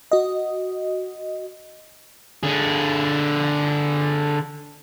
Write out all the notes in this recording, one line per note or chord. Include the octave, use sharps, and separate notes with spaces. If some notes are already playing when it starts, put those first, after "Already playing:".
F#4 D#5
D3 G#4